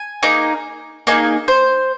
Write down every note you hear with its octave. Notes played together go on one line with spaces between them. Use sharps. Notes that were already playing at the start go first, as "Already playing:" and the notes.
Already playing: G#5
A#3 D#4 G#4
A#3 D#4 G#4
C5